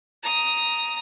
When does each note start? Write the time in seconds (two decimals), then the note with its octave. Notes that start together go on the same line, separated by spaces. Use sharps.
0.23 A#5 D#6